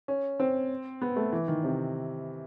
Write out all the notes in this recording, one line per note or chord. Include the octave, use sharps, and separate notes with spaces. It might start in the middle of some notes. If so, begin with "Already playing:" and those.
C#4
C4
B3
A3
E3
D#3
C3